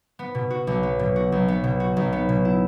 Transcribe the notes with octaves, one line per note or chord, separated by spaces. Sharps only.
B3
B2
F#4
B1
B3
B2
F#4
B1
B3
B2
F#4
B1
B3
B2
E4